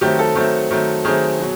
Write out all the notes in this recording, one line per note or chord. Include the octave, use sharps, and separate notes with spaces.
D#3 F#3 A3 C4 G4
A4
D#3 F#3 A3 C4
D#3 F#3 A3 C4
D#3 F#3 A3 C4 G#4
B2 F#3